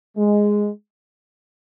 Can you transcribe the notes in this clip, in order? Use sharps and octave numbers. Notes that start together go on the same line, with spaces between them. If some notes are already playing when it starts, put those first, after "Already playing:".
G#3